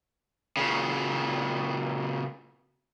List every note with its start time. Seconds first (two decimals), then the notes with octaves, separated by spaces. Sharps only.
0.57 A#2 C#3